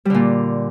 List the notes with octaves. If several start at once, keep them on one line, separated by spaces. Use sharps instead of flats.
A#2 D3 G3